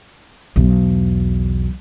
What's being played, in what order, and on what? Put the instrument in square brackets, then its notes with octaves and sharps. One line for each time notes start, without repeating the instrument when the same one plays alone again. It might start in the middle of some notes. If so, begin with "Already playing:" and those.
[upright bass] B1 E2